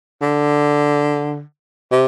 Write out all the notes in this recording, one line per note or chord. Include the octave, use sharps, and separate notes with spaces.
D3
C3